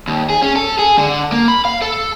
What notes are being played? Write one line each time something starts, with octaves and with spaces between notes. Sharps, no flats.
D#2
G#4
C#4
A4
G#4
D3
A#3
B5
F5
A4